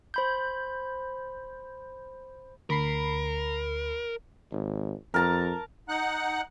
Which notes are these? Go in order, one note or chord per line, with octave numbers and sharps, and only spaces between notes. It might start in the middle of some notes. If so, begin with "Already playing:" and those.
C5 B5 G6
D2 A#4 B5 C7
G#1
F2 A#4 A5 A#5
D#4 F#5 F#6